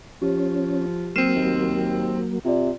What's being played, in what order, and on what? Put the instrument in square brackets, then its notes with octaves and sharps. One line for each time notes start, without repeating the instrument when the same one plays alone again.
[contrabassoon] F3 [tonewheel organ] C#4 [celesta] G4
[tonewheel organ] F#3 A#3 [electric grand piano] C4 E7 [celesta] F6 C7 D#7
[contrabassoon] D#2
[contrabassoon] C3 [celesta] F4 D5